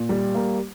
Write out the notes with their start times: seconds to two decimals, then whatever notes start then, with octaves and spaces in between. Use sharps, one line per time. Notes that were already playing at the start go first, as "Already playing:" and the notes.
Already playing: A#2
0.09 G3
0.35 A#3